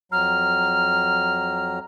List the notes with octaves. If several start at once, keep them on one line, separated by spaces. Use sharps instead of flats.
F2 F#3 A#5 F6